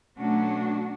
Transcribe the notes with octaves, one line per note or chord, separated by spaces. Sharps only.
B2 F#3 A3 C#4 D4 F#4